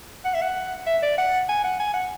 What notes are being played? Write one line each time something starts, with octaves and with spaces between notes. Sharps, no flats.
F#5
E5
F#5
E5
D5
F#5
G#5
F#5
G#5
F#5